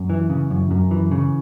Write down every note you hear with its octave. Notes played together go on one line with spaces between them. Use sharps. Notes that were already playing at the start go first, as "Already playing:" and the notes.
Already playing: F#2
E3
C#3
F#2
F#2
E3
C#3